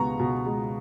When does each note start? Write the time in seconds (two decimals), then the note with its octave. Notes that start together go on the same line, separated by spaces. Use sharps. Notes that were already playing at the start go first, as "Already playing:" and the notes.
Already playing: C#2 B2 G#3 B3 A#5 C#6
0.19 B2
0.46 G#3